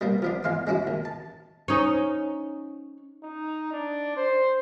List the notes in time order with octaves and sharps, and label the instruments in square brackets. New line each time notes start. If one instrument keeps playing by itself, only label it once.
[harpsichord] G3 A#3 B3
F3 B3 D4
E2 G#3 F5 C6
G#3 C#4 E4 F#4
D#2
A5
[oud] C#4 D#4
[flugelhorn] D#4
D4
C5